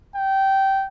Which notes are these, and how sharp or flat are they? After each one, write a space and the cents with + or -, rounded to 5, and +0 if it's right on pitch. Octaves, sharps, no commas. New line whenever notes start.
G5 -15